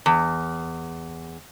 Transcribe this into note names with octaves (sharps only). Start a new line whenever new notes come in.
E2